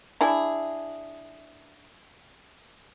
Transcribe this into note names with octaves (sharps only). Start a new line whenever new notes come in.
D4 E4 G#4